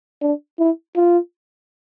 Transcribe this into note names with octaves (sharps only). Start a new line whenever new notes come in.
D4
E4
F4